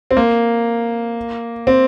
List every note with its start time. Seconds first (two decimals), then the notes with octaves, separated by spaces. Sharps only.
0.11 C4
0.17 A#3
1.67 C4